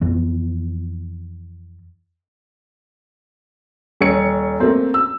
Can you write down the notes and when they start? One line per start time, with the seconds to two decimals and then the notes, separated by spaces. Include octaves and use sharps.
0.01 F2 E3 B3
4.01 D#1 C#5 C#7
4.60 A3 A#3 C4
4.94 E6